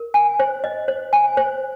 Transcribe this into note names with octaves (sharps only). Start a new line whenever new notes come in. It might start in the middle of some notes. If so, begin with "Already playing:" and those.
Already playing: A#4
G#5
C5
D#5
C5
G#5
C5